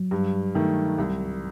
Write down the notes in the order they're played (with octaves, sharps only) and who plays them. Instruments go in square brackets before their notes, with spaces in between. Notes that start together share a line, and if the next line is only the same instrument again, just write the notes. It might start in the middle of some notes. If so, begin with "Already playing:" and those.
Already playing: [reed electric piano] F#3
[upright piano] G2
D#3 A3
C2